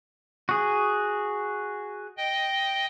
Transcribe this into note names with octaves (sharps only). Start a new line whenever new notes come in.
F#4 G#4
D#5 G5